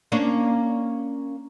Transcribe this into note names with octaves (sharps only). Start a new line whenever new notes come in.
A#3 C#4 D4